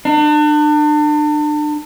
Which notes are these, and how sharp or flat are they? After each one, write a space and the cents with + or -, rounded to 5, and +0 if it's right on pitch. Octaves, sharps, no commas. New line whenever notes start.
D4 +35